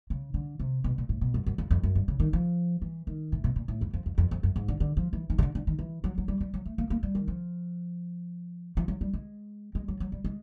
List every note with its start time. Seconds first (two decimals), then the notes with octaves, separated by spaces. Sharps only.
0.10 C#3
0.34 D3
0.60 C3
0.84 B2
0.98 A#2
1.09 A2
1.21 B2
1.34 F#2
1.46 F#2
1.58 F2
1.71 F2
1.83 F#2
1.95 G2
2.08 C#3
2.20 D#3
2.33 F3
2.82 E3
3.07 D#3
3.32 A2
3.44 B2
3.56 A#2
3.68 A2
3.81 F2
3.94 F2
4.06 F2
4.18 F2
4.31 F2
4.43 F#2
4.56 G#2
4.68 D3
4.80 D3
4.97 F3
5.13 E3
5.30 D#3
5.38 C#3
5.43 D3
5.55 D3
5.67 D#3
5.79 E3
6.04 F#3
6.18 F#3
6.28 G3
6.41 G3
6.54 F#3
6.66 A3
6.78 A#3
6.90 A#3
7.03 G3
7.15 D#3
7.28 F3
8.77 F3
8.88 F#3
9.01 G3
9.14 G#3
9.75 G#3
9.88 F#3
10.00 F#3
10.12 G3
10.25 G#3